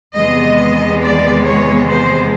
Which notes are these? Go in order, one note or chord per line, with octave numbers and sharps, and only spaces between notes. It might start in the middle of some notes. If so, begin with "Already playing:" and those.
E2 C3 D#3 G#3 B3 D#5
D5
C#5
C5